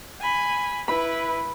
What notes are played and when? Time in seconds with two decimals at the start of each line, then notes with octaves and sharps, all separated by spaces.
0.21 G#5 B5
0.88 E4 B4 B5